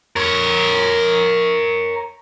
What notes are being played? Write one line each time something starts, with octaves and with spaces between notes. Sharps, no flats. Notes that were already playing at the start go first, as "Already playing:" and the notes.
A#4 C#5